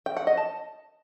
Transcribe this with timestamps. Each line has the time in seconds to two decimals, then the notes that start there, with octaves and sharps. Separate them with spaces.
0.06 G5
0.17 F#5
0.27 D#5
0.37 A5